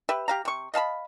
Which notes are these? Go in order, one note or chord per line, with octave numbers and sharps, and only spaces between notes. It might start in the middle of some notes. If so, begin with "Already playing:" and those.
G4 B4 E5
G4 F5 A#5
C3 C#6
D#5 F5 A5 B5